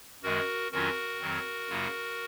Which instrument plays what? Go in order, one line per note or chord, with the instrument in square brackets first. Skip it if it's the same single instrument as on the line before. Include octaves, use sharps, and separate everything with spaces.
[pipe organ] F#2 D#3 G#3 F#4 A#4
F2 D#3 F#3 C#4 F4 F#4 A#4
F2 D#3 F#3 C4
F#2 C#3 F#3 A#3 F4